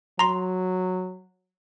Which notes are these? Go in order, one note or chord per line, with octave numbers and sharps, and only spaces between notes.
F#3 A#5 C6